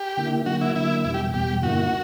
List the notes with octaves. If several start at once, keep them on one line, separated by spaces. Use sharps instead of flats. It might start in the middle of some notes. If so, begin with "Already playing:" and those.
Already playing: G4
D3 A#3 E4
D3 F#3 A#3 F#4
E4
D3 F#3 A#3 E4
E2 B2 G3 E4
G4
E2 B2 G3 G4
G2 D3 A#3 E4 F#4